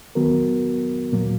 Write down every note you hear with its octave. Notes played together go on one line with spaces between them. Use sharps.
D#3 F#3 B3 F#4 A#4
A#2 F#3 A#3